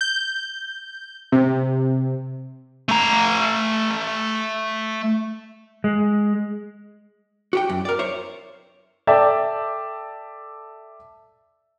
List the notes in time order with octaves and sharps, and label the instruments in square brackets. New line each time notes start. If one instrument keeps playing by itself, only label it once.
[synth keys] G6
C3
[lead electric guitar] A3 A#5
[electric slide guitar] G#3
[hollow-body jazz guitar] F#4 G4 G5
F#2
A#4 D5
C5 C#5 E5
[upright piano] A4 D5 E5 G5 A5